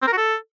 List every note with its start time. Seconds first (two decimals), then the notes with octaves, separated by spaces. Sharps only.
0.03 C4
0.08 A#4
0.13 F#4
0.18 A4